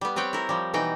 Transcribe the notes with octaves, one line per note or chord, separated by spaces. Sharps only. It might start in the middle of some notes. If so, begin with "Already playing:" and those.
G3 B3
C4 B4 C#5 G5
E4 A#4
F3 G3
B2 E3 D#4 G5